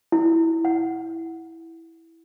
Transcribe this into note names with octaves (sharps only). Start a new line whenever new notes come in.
E4
F#5